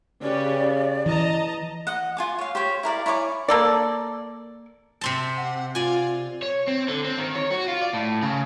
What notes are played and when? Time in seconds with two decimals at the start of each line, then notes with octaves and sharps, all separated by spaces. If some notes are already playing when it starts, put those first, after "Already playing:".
0.22 C#3 C#4 G4 B4 D5
1.06 E3 D#5 A5 A#5
1.87 D#5 F#5
2.17 F4 G#5 D6
2.39 C#5 F5
2.55 G4 C5 C#5
2.83 E4 A#4 D5 F5
3.06 E4 C#5 G#5 D6
3.48 A#3 A4 D5
5.01 C3 C4 A5
5.37 F#5
5.75 F4 D5 G#5
6.43 C#5
6.67 C4
6.88 D3
7.04 C4
7.18 D#3
7.35 C#5
7.51 F#4
7.67 F4
7.81 D5
7.93 A2
8.22 C#3